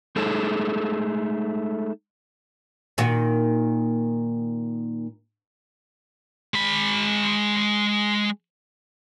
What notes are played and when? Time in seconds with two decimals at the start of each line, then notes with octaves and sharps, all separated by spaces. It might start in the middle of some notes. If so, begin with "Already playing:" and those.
0.16 G#3 A3 D#4 G#4 A4
2.98 A#2 D#3 F#4
6.54 G#3 B5